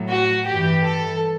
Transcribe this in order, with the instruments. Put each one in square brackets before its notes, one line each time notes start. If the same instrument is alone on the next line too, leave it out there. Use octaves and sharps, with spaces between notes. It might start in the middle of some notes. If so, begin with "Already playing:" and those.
Already playing: [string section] A2 F#3
F#4
G2 E3 G4
A4